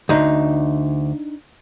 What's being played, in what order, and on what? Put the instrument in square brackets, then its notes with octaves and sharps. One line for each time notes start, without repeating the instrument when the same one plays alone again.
[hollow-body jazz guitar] D2 [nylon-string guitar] D4 D#4